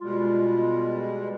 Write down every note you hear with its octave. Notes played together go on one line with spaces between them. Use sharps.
B2 G3 G#3 F4